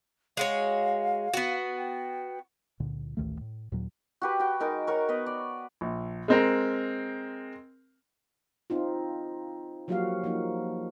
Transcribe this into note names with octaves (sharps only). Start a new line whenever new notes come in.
G#3 F#4 C#5 F5
B3 F#4
G5
C#2 A#2 D3
A1 D2 D#3 A3
A2
D#2 A#2 F#3
F#4 G4 B4
F#4 G5
G#3 D#4 A#4 A5
F#4 A#4 C#5
B3 B4 D#5
D5
A#1
G#3 C4 A#4
C4 D#4 F4
F3 F#3 A#3 F#4 G4 F5
F3 A#3 D#4